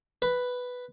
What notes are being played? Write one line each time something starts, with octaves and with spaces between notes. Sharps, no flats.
B4